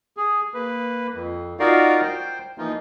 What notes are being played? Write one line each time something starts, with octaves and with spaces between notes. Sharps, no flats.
G#4
A#3 B4
F2
D#4 F4 F#4 A#4 D5 F5
C5 G5
E3 F3 A#3 D#4 F4